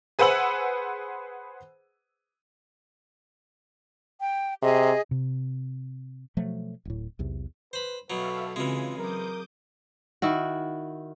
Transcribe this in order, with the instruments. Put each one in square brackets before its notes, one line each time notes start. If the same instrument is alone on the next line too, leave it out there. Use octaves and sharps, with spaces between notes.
[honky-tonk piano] G#4 B4 C5 F#5 E6 F#7
[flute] G5
[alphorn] C3 [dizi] G#4 [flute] D#5
[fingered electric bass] C3
[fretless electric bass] B2 F3 F#3 A3
D1 A2
B1 E2 C3
[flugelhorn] B4 [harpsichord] C5 B5
[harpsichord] B2 F#3 [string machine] A4 E5 F5 [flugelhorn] B4
[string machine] C#3 G#4 [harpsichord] E3 G#3 [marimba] C4 F#4 [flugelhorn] F4
[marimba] F#3 [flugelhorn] A#4 [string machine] D6 D#6 G6
[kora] D#3 E4 F#4